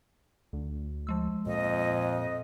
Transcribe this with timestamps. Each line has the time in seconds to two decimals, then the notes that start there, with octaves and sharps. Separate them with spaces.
0.53 D2
1.07 F3 G#3 E6
1.47 F2 A#2 D#5